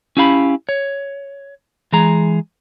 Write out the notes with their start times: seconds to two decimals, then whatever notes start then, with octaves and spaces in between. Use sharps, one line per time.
0.17 C#4 E4 G4 F5 A#5 B5
0.69 C#5
1.93 E3 G#3 G#4 A#5